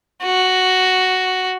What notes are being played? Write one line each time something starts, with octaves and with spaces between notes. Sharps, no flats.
F#4